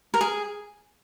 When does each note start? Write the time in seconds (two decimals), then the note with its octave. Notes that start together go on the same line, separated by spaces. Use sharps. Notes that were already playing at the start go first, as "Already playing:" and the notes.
0.14 A#4
0.21 G#4